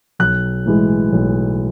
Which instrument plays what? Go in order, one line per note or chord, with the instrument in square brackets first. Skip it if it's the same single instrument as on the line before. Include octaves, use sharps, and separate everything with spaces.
[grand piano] B1 F#6
A2 E3 G#3
B1